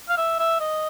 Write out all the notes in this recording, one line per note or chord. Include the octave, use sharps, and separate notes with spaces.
F5
E5
E5
D#5